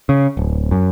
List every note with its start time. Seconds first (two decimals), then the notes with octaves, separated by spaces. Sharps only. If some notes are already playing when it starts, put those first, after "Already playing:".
0.09 C#3
0.37 D1
0.71 F#2